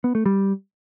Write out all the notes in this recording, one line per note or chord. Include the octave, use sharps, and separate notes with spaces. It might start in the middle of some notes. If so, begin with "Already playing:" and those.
B3
A3
G3